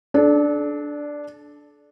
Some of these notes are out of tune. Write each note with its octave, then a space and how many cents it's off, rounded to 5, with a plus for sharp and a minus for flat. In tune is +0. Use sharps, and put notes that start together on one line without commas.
D4 +0 A4 -35